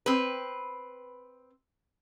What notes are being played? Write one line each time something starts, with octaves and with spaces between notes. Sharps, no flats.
C4 B4